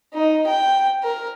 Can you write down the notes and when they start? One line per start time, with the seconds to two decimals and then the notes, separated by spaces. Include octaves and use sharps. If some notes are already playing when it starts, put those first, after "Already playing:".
0.14 D#4
0.47 G5
1.03 A#4